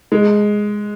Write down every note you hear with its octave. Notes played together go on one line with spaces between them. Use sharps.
G#3